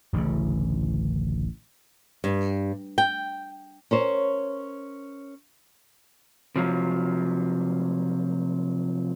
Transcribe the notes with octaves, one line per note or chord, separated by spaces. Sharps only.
D1 A1 A2 C#3
G2
G5
C#4 A#4 C5 C#5
C3 F3 F#3